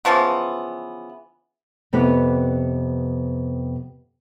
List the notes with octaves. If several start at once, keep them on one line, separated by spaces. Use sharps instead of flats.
C#3 E3 F3 B3
F2 C3 B3 G4 B4 C#5